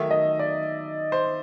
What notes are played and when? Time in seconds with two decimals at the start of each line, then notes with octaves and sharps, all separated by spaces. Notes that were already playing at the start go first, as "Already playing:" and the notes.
Already playing: D#3 F#3 A3 E5
0.11 D#5
0.39 D5
1.12 C5